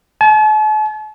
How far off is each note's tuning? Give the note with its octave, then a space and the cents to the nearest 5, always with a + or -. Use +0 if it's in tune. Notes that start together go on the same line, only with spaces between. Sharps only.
A5 -45